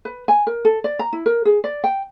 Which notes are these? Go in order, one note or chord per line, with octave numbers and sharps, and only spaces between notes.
B4
G#5
A#4
A4
D5
A#5
E4
A#4
G#4
D5
G5